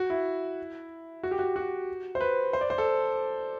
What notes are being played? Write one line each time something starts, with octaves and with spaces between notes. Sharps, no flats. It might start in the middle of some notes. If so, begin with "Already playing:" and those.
Already playing: F#4
E4
F#4
G4
F#4
F#4
C5
B4
C5
D5
C5
A4